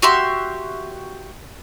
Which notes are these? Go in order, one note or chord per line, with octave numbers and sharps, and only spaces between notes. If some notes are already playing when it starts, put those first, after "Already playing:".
F#4 G4 E5 C6